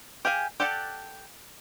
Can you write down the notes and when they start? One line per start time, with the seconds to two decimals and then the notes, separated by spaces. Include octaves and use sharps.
0.25 G4 G#4 F5 G#5
0.60 G4 A4 D5 F#5 A5